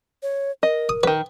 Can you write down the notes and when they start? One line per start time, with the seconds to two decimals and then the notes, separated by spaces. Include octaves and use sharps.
0.23 C#5
0.63 A#4 D#5
0.89 D#6
1.03 D#3 F#3 B4